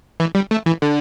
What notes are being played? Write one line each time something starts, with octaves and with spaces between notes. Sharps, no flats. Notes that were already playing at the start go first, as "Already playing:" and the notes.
E3
G3
A3
E3
D3